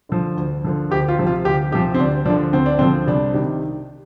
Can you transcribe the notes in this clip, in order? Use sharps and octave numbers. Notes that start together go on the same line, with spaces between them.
D3 F3
D2
D3 F3
D2 G4
F4
C3 F3
F4
D2 G4
C3 F3 G4
C4
D2 D4
D3 F3 D4
D2 C4
D4
D3 F3 C4
C2 D4
C3 D#3